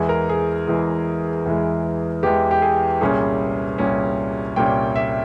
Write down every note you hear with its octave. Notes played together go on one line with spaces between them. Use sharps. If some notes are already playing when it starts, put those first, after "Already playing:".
Already playing: E2 E3 G#3 G#4
A#4
G#4
E2 E3 G#3
E2 E3 G#3
E2 E3 G#3 G4
G4
G#4
C2 A#2 G3 C#4 G#4
C2 A#2 G3 C#4
C2 A#2 G3 C#4 G5
E5